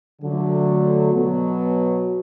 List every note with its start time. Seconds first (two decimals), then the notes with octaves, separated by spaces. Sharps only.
0.22 D3 F#3 A3
1.13 B2 F#3 B3